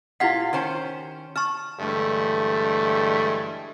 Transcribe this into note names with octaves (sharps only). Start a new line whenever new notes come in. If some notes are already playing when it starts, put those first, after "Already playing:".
A#2 E4 F4 G4 F#5 G#6 B6
D#3 C#4 C5
A5 C#6 F6
G2 D3 E3 G#3 A3